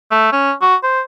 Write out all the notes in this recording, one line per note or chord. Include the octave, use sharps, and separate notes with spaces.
A3
C#4
F#4
C5